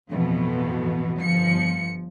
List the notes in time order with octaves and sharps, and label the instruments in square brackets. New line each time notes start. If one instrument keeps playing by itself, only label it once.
[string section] A1 F2 B2 E3
G1 F3 C#7